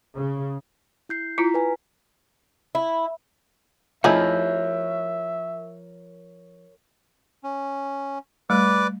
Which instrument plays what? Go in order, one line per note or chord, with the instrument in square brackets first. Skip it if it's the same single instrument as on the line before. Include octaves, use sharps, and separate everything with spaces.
[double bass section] C#3
[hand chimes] E4 G6 C7
[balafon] E4 F4 [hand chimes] A#5 B6
[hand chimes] B4 G#5
[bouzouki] E4
[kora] F3 E4 [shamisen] A3 D#4 G#4 [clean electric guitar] A#4 C#5 [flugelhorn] E5
[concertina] C#4
[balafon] G3 A3 [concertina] B4 D5 D6